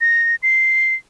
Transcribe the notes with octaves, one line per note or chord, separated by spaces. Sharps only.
A#6
C7